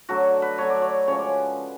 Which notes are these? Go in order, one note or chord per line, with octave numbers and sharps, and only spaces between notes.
D3 F#3 A3 F#4
B4
D3 F#3 A3 C#5
D5
C#5
C#3 F3 G#3 C#5
D5